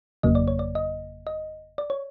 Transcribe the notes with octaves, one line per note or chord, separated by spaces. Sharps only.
G1 F2 C#3 F#3 A#3 D#5
D5
C#5
D5
D#5
D#5
D5
C#5